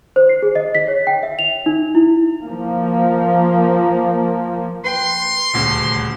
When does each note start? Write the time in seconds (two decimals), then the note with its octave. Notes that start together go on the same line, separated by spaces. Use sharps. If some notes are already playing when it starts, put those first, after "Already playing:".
0.16 C5
0.29 C7
0.42 G#4
0.55 D#5
0.75 B6
0.88 C#5
1.07 G5
1.23 E5
1.39 F7
1.66 D#4
1.95 E4
2.43 F3 A#3
4.84 B4 G5 C6
5.54 D#1 D2 C#3